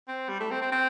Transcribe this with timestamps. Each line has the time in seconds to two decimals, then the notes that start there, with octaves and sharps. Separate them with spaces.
0.08 C4
0.29 G3
0.40 A3
0.51 C4
0.62 C4
0.72 C4